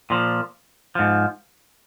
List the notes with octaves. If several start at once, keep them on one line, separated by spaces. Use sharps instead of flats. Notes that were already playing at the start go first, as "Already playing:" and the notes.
A#2 F3
G#2 F3